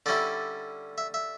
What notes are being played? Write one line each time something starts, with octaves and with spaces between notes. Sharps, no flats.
D3 G3 C#4 E4 D5
E5
E5